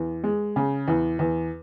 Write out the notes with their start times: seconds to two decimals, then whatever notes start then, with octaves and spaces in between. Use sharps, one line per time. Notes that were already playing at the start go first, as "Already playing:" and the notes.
Already playing: E2
0.24 G#3
0.56 C#3
0.88 E2
1.19 E2